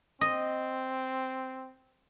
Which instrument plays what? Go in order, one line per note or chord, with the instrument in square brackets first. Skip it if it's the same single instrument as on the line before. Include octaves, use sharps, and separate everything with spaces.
[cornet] C4 [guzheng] D#5